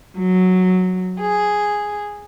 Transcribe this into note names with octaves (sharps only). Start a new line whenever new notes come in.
F#3
G#4